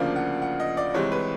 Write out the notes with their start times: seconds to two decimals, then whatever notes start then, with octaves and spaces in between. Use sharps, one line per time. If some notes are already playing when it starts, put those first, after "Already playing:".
Already playing: D2 C#3 F3 A#3 D4 F5
0.16 F#5
0.42 F#5
0.60 D#5
0.77 D5
0.94 C2 C3 E3 G#3 C4 C#5
1.12 B4